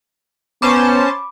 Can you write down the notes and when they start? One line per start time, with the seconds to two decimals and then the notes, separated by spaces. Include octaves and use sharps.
0.62 B3 C#4 C5 A5 B5 D6